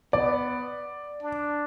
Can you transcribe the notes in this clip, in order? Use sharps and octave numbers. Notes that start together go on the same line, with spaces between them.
B3 D5
D4